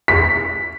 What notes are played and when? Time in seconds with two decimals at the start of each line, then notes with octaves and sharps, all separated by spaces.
0.08 B6